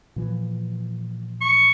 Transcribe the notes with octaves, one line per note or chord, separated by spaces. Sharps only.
A#2 E3 F3
C#6